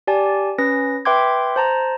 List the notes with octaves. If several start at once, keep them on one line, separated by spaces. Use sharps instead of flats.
G4 D5 G#5 A5
C#4 B4 A#6
B4 E5 G5 C6 D6 G#6
C5 A5 A#5